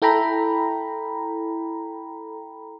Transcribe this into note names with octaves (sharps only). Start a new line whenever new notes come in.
E4 A4 G5 A#5 B5